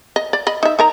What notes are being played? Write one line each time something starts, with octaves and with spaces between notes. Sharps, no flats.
D#5
D5
D#5 B5
D#4 E5
D#4 A#4 A#5